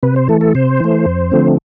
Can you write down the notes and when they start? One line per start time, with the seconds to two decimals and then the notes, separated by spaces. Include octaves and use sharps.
0.03 C3 B4
0.16 C5
0.28 E3 A3 A4
0.41 A4
0.55 C3 C5
0.80 E3 A3
1.06 F2
1.32 D3 F3 A3 C4